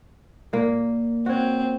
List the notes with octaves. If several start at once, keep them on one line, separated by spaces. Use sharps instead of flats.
A#2 A#3
C4 F#4 C#5